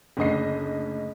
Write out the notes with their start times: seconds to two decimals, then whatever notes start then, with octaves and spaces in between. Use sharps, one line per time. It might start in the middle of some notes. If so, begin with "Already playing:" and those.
0.17 F#1 D2 D#5 C7